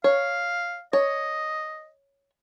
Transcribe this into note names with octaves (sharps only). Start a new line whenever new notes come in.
C#5 F5
C#5 D#5